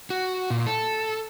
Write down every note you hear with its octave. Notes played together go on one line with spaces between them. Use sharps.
F#4
A#2
A4